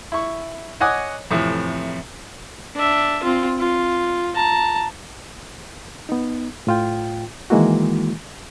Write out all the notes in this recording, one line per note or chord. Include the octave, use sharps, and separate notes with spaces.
E4 C#6
C#5 D#5 F#5 G#5 D6 D#6
F2 A2 C3 E3
D4 E5
C4 F4
F4
A5 A#5
B3 D#4
A2 F4 G5
D#3 E3 G#3 A#3 E4 F#4